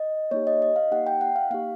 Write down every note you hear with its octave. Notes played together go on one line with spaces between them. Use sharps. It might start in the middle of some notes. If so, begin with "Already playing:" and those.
Already playing: D#5
A#3 D#4 G4 C#5
D#5
D#5
F5
A#3 D#4 G4 F#5
G5
F#5
F5
A#3 D#4 G4 F5